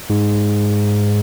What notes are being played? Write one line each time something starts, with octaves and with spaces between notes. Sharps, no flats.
G#2